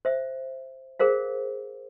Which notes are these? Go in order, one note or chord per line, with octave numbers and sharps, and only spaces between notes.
C5 E5
G#4 A#4 C5 F5